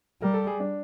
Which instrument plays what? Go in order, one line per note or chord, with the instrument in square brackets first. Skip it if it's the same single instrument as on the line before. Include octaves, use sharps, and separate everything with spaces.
[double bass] G3 [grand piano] A#4
[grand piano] A4
G#4
D4